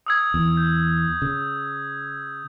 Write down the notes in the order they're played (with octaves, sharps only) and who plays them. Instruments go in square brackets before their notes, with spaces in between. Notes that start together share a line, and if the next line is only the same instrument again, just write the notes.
[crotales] D#6 E6 G#6
[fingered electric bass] E2
[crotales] G6
[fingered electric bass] C#3